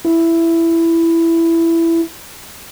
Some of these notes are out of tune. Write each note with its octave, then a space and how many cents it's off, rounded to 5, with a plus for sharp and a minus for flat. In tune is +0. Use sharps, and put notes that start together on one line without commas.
E4 +10